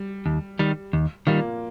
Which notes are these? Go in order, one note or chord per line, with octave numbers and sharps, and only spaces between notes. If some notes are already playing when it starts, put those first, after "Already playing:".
Already playing: G3
D#2
D#3 G3
D#2
A#2 D#3 G3 A#3